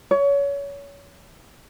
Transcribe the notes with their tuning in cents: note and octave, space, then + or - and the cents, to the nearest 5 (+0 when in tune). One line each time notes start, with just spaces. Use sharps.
C#5 +25